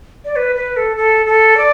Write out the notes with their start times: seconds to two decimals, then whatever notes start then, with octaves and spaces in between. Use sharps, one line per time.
0.25 D5
0.36 B4
0.56 B4
0.76 A4
0.96 A4
1.26 A4
1.57 D5